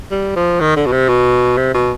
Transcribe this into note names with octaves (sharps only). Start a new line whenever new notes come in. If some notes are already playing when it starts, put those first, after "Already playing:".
G3
F3
D#3
D3
B2
C3
B2
C3
B2